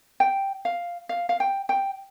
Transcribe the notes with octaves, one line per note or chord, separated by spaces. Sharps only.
G5
F5
F5
F5
G5
G5